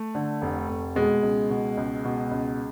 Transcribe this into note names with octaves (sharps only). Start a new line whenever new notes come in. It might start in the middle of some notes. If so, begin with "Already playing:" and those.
Already playing: A3
D3
F1
F1
B2 G#3
C#2
B2
C#2
B2
C#2